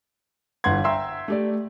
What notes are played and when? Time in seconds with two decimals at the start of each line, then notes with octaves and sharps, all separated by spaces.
0.64 G1 G2 E3 F#5 C6 G#6
0.84 E5 F#5 G5 A#5 C6 E6
1.28 A3 G4 D5